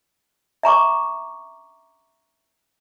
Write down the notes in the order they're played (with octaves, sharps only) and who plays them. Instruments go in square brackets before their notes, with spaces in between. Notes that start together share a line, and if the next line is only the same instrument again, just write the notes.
[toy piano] E5 A#5 C#6 D6